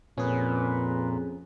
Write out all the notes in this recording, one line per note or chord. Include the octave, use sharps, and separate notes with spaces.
F2 A#2 C#4 G#4 B4